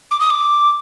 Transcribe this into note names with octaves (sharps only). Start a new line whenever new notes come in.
D6
D#6
D6